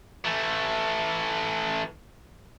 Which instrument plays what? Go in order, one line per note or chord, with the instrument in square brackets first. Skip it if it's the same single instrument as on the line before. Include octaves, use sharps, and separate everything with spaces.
[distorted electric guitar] E3 A3